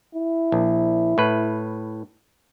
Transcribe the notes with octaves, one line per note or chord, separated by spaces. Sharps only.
E4
A#1
A2 B4